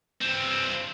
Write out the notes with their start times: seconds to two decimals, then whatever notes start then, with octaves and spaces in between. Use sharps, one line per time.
0.21 G2 C4